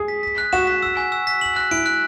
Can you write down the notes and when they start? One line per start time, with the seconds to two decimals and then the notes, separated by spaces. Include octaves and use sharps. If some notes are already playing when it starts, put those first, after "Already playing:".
Already playing: G#4
0.08 B6
0.23 B6
0.38 F#6
0.53 F#4 E7
0.67 B6
0.82 E6
0.97 G#5
1.12 E6
1.27 B6
1.41 F#7
1.56 F#6
1.71 E4 D7
1.86 F#6